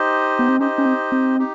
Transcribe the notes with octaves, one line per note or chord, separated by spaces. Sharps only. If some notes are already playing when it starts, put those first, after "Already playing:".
Already playing: D#4 G4 C5 D#5
B3
C4
C#4 D#4 G4 C5 D#5
C#4
C4
C4
D#4 G4